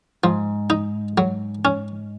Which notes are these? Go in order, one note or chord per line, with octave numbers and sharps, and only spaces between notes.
G#2 F3
D#4
F#3
C#4